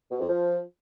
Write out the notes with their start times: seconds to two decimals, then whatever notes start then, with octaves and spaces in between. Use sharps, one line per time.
0.12 B2
0.20 F2
0.29 F3